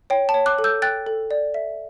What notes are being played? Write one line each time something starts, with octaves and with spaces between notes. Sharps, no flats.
C#5 G5
A5
C#5
D6 F#6
A4
E6 G6
G5 F#6 A6
A4
D5
E5